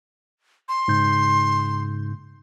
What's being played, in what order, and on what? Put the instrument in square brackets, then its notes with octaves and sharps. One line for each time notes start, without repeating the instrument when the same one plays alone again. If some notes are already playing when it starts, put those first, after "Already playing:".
[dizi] C6
[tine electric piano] G#2 C#3 G6